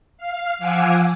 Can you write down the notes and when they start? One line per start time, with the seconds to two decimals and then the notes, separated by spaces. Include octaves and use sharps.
0.18 F5
0.58 F3 F5 F#5 G#5 D6 E6